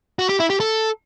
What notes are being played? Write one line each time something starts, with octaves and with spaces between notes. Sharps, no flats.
F#4
G4
E4
G4
A4